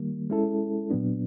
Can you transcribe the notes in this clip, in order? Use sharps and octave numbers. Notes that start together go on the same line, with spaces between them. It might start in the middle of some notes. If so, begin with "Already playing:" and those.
Already playing: D#3 G3 A#3
G#3 C#4 E4 A4
A#2 F#3 B3 D4